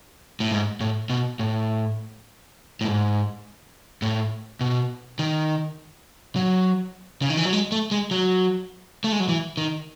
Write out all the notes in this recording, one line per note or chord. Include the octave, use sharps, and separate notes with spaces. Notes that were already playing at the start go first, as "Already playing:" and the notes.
A2
G#2
A2
B2
A2
A2
G#2
A2
B2
D#3
F#3
C#3
D#3
E3
F#3
G#3
A3
G#3
F#3
A3
G#3
F#3
E3
D#3